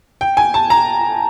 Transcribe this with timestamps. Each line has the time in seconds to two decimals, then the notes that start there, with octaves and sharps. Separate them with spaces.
0.21 G5
0.37 G#5
0.54 A5
0.70 A#5